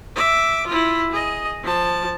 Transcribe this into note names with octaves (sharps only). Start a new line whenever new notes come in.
E5 D6
E4 F4
G#4 D#5
F3 A5